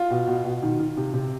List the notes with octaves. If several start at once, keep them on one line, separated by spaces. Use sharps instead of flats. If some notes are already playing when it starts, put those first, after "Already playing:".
Already playing: F4
B2
B2
B2
D#3
D#3
C3
C3